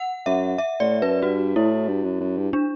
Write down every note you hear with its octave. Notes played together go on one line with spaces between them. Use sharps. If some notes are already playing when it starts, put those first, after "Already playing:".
Already playing: F#5
F#2 E5
E5
A2 D5
F#2 B4
G2 F#4
A2 E4
G2
F#2
F#2
G2
D4